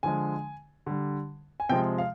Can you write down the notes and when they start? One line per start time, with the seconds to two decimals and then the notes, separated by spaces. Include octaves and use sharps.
0.03 D3 F3 G#3 G#5
0.86 D3 G3
1.60 G#5
1.69 C3 F3 G#3 G5
1.98 F5